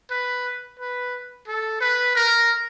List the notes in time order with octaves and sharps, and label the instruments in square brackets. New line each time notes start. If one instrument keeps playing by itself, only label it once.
[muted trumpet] B4
B4
A4
B4
A#4